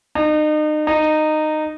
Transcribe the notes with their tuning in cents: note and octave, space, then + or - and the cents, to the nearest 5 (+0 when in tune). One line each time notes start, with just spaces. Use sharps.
D#4 -35
D#4 -15